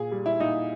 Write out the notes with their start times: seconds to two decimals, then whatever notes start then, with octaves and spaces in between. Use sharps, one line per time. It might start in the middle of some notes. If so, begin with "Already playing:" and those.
Already playing: A#2 G#4
0.12 G3
0.26 E4
0.40 A#2 D#4